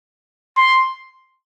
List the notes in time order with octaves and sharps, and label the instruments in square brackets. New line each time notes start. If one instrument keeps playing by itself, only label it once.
[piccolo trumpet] C6